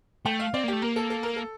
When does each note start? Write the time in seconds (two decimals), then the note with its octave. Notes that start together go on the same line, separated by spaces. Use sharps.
0.25 A3 G5
0.39 F5
0.54 C4 D5
0.64 A#3
0.68 A3 G4
0.82 A#3 A#4
0.96 A4
1.10 A4
1.23 A#4
1.36 A4